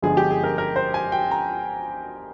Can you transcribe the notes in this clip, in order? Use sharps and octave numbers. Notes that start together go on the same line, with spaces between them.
G1 G2 D3 F3 G#3 G#4
G4
G#4
A#4
A#4
C5
G#5
G5
A#5